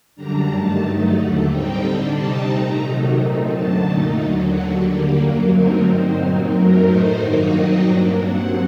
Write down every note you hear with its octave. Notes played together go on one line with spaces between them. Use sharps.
F#2 D3 G3 D4 A#5
G2 D#3 A3 A5
G2 F#3 A3 D#4
D#2 D3 A3 F#5
A2 G3 C4 D#4 G5
D3 G3 D4
C3 G3 C4 D#4 A5
A#2 A3 D#4 A#5
C3 D#3 F#3 A3 D#4
A#2 A3 C4 D#4
F#2 D3 F#3 A5
A#2 A3 D#4
D#2 D3 F#3
D#2 D3 F#3 F#5
D3 G3 A#3
F#2 F#3 A#3
D3 F#3 A3 C4 D#4 A#4
G2 F#3 C4 D#4 C5
A#2 F#3 C4 D#4
F#2 F#3 A3 A#4
A2 A3 D#4 C5
G2 D#3 F#3 A#3 D#4
A#2 F#3 C4 D#4 D#5
G2 F#3 A#3 D4
G2 F#3 C4 F#5